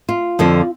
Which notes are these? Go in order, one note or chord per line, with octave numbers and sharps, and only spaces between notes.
F4
F2 D3 F3